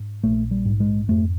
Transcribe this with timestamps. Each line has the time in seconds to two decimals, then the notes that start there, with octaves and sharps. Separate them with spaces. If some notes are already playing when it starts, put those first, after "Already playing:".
Already playing: G#2
0.23 A#1 A3
0.51 G3
0.65 G#2
0.80 G#3
1.08 F2 A3